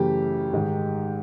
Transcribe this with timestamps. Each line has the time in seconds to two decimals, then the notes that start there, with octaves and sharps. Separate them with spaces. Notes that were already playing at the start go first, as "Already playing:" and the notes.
Already playing: F#2 C#3 E3 A3 G4
0.53 G#2 D#3 G#3